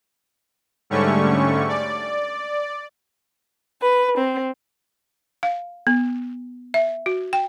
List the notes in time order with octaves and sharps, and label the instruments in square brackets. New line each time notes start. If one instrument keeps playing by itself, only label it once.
[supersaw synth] G#2 D3 G3 A3 C#4 C#6
D5
[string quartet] B4
C4
[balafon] F5
B3
E5
F#4
G5